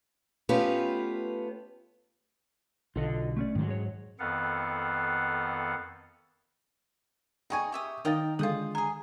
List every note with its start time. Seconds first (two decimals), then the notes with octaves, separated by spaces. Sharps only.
0.49 A3 B3 C#4 F4 G4 B4
2.96 B1 D3 F4 A4 D#5
3.37 A3 C#4 D5
3.55 G#2 D#3 F#3
3.68 G#4 C#5
4.19 F2 D#3 B3 A4 F5 F#5
7.50 D#4 G#4 G5 G#5 C#6
7.72 G4 E5 D#6
8.05 D#3 D#4 A#4 D#5 F5 G5 A6
8.39 D3 G#3 F4 G#4 A4 F5 D#6
8.75 G#4 G#5 A#5